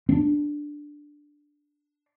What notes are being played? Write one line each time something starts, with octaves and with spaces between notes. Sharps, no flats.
C4 D4